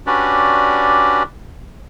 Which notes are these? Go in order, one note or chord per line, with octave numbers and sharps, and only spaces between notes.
C#4 D4 F#4 G4 B4 D5